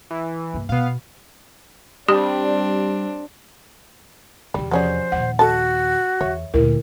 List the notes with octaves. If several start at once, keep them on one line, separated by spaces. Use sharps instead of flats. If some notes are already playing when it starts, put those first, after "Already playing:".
E3
G2 A#3
B2 B3 F5
G3 C4 D4 G4
E2 C3 G3 G4
F3 F#3 C#4 G#4 C5 D5
D#2 A#2 F#5
F#4 A4 D#5 A5
E2 C#5 E5
D2 A#2 E4 A#4